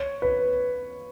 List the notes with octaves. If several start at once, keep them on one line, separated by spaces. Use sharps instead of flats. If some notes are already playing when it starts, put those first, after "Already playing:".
Already playing: C#5
B4